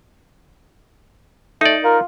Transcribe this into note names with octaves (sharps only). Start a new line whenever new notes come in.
A3 D#4 D5
F4 A#4